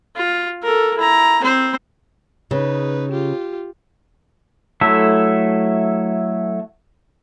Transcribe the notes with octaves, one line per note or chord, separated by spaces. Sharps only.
F4
A4 A#4
E4 A#5
C4 C5
C#3 D#4 B4
F4 G4
F#3 A3 E4 A4 E5